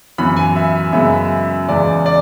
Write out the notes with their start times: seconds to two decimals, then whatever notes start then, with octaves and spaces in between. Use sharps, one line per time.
0.18 F#2 E3 B3 B5
0.37 G#5
0.56 E5
0.93 F#2 C#3 G#3 B3 E5
1.68 E2 C#3 E3 G#3 D5
2.06 D5